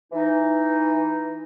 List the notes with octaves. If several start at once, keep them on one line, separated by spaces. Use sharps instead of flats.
E3 D#4